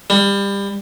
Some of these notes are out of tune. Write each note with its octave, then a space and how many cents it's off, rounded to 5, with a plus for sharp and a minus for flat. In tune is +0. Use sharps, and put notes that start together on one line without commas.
G3 +25